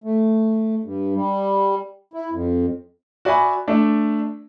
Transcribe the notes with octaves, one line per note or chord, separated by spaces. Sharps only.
A3
G2
G3
E4
F2
F#4 D5 E5 G#5 B5
A3 D4